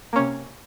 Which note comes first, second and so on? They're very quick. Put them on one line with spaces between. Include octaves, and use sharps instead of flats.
A#3 C#4 C3